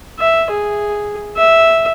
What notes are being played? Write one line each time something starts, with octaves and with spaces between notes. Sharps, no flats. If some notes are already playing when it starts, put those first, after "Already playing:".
E5
G#4
E5